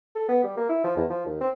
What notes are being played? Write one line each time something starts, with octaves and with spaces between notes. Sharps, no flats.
A4
B3
G3
A#3
E4
F3
E2
F3
D#2
C4